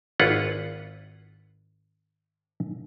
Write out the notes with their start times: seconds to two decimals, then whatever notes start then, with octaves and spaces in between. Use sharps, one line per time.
0.20 G#1 E4 F4 B4 F#5